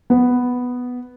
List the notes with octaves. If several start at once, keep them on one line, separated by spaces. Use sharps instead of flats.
B3